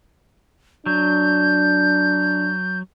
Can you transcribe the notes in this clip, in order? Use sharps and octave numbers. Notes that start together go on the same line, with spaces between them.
F#3 D4 G6